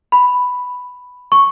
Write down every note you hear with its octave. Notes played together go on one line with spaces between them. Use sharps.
B5
C#6